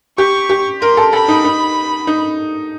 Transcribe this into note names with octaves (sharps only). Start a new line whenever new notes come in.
G4 C#6
G4
A#4 C6
A4
A4 B5
D#4
D#4
D#4